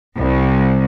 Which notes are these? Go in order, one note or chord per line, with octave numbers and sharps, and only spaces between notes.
C2